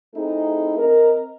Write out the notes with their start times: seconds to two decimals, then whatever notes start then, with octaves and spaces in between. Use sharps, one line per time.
0.14 A3 C4 D#4 E4 G#4 A4
0.77 C4 A#4 D#5